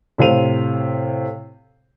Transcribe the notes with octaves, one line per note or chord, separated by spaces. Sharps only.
A2 C3 C5 F5 D#7 F7